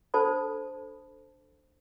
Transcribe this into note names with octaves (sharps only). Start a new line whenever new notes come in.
D4 A4 C5 A5 B5